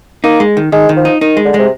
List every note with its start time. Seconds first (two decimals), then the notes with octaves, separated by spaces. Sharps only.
0.24 A#3 D#4
0.40 G#3
0.57 D#3
0.72 D#3 G#3
0.89 D#3
0.97 F3
1.05 D#4
1.21 D#3 D#4
1.37 G#3
1.45 D3
1.54 C3 G#3